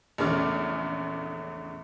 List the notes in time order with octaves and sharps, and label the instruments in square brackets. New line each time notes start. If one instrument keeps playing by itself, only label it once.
[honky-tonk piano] A#1 E2 C#3 A3 D6 F6